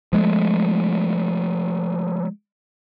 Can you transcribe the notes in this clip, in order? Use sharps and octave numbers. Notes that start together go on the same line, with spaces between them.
F3 G#3 A3